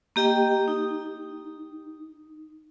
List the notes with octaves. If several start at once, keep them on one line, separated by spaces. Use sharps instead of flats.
A#3 G4 D#5 G5
D#4